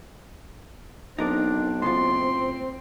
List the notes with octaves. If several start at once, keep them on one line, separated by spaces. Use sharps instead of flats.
B1 C4 D4 D#4 A#4 D5
A2 C#3 C4 F4 C6